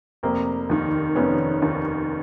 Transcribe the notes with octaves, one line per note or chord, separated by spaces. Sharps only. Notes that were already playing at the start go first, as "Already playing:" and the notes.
F1 A#3 C4
D#2 D#3
F1 B3 C#4
D#2 D#3